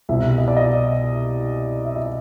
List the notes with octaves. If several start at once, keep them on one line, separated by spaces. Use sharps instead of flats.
C2 B2 E5
D#5
D5
D#5
E5
D#5